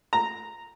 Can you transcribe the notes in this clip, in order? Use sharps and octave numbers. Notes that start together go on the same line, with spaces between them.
A#5